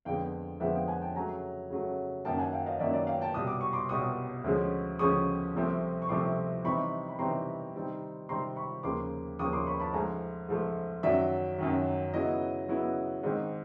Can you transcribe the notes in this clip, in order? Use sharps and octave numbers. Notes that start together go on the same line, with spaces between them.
F2 D3 F3 G#3 B3 F5 G5
F2 D3 F3 G#3 B3 E5 F#5
F5 G5
F#5 G#5
G5 A5
C#3 F#3 A3 G#5 A#5
C#3 F#3 A3
F#2 D#3 F#3 A#3 G5 A5
F#5 G#5
F5 G5
D#5 F5
F#2 D#3 F#3 A#3 D5 E5
D5
F5 G5
G5 A5
C2 B2 G3 D#6
D6
C#6
C6 D6
C2 B2 G3 C#6 D#6
D2 C#3 F3 G#3 C#4
D2 C#3 F3 G#3 C#4 C#6 D#6
C2 C3 F3 A3 C4
C#6
C2 C3 F3 A3 C4 C6 D6
C3 E3 G3 C4 D#4 B5 C#6
B5
C3 E3 G3 C4 D#4 A#5 C6
C3 D#3 G3 C4 D#4
C3 D#3 G3 C4 D#4 A#5 C6
B5 C#6
D#2 C#3 F3 A#3 C6 D6
D#2 C#3 F3 A#3 C#6 D#6
C6 D6
B5 C#6
A5 B5
G#2 F3 A3 G#5 A#5
G#2 F3 A3
F#2 D#3 F#3 D5 E5
F#2 D#3 F#3
C#3 F#3 B3 E4 D#5
C#3 F#3 B3 E4
G#2 D#3 G#3 C4 D#5